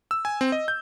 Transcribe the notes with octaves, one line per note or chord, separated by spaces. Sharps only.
E6
G#5
C4
D#5
G6